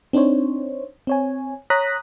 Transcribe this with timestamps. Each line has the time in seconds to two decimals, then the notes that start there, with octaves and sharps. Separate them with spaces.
0.13 C4 D4 D#4 C5 C#5
1.07 C4 C#5 G#5
1.70 C#5 A#5 D#6 F#6 A#6 B6